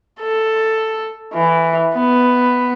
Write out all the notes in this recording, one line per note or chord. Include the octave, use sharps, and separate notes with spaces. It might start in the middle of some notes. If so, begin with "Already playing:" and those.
A4
E3
B3